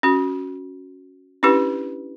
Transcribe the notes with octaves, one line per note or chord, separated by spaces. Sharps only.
C#4 F#4
C#4 D4 E4 G4 B4